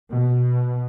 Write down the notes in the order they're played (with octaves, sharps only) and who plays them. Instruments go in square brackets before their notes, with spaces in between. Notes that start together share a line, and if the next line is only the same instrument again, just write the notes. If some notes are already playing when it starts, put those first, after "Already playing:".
[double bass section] B2